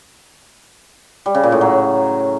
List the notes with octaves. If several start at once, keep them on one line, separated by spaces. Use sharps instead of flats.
G3
C#3
A#2
A2
F#3